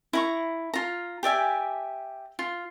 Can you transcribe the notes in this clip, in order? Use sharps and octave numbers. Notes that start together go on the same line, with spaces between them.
E4 A#5 C#6
F4 A#5
G4 D5 E5 G#5
F4